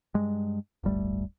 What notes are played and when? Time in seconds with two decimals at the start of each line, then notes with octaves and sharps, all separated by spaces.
0.14 G2 G#3
0.84 D1 G1 G3 A3